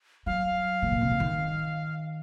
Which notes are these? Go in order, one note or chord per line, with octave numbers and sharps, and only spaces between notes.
F#3 F5
A2
A#2
C3
C#3
D#3